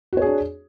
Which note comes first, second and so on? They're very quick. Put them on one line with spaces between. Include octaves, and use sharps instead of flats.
F#4 C#5 G#4 D4